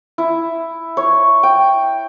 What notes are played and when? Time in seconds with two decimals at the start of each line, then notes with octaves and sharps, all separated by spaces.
0.18 E4
0.97 C#5
1.43 G5